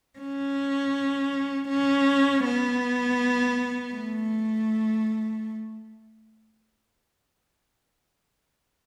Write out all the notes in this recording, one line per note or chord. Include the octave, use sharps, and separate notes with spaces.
C#4
C#4
B3
A3